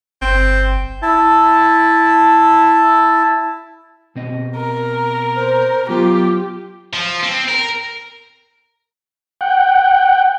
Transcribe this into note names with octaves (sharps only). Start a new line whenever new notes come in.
G1 C4
E4 A5
B2 C4 D#5
A#4
C5
F#3 B3 F4 G4
F3
C4
A#4
F#5 G5